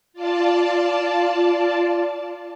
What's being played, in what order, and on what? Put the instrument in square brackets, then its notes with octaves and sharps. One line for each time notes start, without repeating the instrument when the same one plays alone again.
[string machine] F4 D5 A5